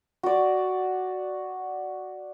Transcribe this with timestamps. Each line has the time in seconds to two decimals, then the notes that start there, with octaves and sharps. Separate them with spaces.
0.23 F#4 D5